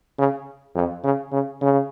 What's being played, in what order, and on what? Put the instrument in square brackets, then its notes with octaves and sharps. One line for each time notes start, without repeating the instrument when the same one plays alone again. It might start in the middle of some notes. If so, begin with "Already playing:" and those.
[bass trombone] C#3
F2
C#3
C#3
C#3